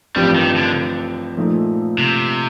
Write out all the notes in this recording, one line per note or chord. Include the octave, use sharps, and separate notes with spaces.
A1 G2 F3 G3 C4 G4
D#3
D3
A#2 F3 A3 D#4 A4
C3